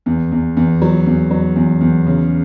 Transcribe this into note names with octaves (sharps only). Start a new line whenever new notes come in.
E2
E2
E2
F#3
E2
F#3
E2
E2
C#3